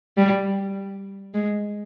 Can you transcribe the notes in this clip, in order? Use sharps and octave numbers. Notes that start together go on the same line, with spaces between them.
G3
G#3